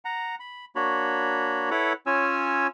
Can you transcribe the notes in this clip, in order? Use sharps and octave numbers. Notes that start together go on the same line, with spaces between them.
F#5 A#5
B5
A#3 D4 F#4 C#5 B5
E4 A4 B4 C#5 F#5 B5
C#4 F4 C#5 G#5 E6